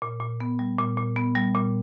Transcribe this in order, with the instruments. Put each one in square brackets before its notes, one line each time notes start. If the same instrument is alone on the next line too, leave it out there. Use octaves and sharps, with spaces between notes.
[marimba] A#2
A#2
B3
G3
A#2
A#2
B3
G3
A#2